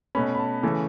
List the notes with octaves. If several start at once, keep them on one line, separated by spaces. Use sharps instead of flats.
B2 A3 C#4 B5
B5
A5
C#3 E3 A3 C#4